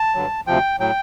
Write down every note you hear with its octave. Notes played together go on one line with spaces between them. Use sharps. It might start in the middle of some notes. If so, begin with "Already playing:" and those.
Already playing: A5
G2 D3 F#3
D2 C3 F3 G5
A2 F#3 G5